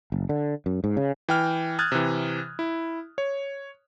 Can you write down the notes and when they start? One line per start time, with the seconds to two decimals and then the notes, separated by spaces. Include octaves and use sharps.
0.12 F#1
0.29 D3
0.66 F#2
0.84 G#2
0.97 C#3
1.29 E3 G5 F6
1.79 D#6 F6 F#6 G#6 A6
1.92 C3 E3
2.59 E4
3.18 C#5